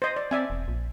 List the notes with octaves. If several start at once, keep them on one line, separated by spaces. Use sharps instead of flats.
C5 D#5
D5
C4 D5 E5 G#5
E1
A#1